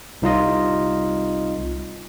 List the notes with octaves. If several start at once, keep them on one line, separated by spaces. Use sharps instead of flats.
C2 D#4 F4 D#5